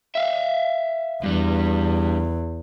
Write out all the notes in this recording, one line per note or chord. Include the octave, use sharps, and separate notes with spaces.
E5 F5
E2 G2 G3